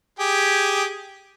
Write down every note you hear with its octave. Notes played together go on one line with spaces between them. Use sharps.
G4 G#4